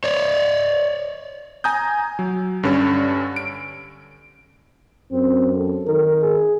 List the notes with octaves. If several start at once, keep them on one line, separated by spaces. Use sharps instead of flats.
C#5 D5
G#5 A#5 D#6 G6
F#3
G2 D3 C#4
D7
F#2 C4
A4
D#3 A#4
G#4